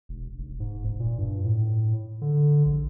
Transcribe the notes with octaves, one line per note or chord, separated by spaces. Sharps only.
E1
F1
G#2
E1
A#2
G2
A2
D3
A#1